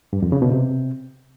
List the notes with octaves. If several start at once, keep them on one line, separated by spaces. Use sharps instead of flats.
G2
F2
C#3
B2
C3